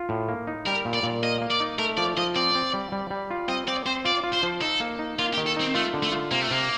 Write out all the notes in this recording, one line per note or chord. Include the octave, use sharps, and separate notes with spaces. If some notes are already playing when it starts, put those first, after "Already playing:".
Already playing: F4
A2
A#3
D#4
G3 A#4
A#2
D5
A#2
A#3 D#5
A#3
D5
D#4
A3 A#4
F3 D5
F3 D#5
C4 D5
C4
G3
G3
G3
F4
C4 D#5
C4 D5
C4 C5
F4 D5
F4
C5
F3
D#4 A4
A#3
D#4
A#3 F4
G4
D#3
A4
C4 D#4
A3 F4
D3
A3
F4
C3 A#3
A3
C3 A#3